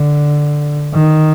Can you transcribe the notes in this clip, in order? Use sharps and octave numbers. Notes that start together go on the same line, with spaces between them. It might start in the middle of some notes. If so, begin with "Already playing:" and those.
Already playing: D3
D#3